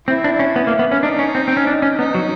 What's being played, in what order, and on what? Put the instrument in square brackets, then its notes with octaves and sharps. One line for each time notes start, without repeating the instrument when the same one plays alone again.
[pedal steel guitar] C4 [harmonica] E4
[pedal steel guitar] D4
C#4
B3
A#3
B3
C#4
[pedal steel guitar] D4 [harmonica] D#4
[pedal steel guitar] C#4
C4
C4
C#4
D4
C#4
[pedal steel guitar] B3 [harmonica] D#4
[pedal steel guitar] F#3